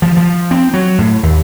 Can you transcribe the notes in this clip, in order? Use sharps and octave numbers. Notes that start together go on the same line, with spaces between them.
F3
F3
C4
F#3
A2
D#2